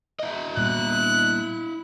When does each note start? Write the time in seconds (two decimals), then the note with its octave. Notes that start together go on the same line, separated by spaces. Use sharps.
0.20 E4 D#5
0.57 A#2 G3 B3 F#6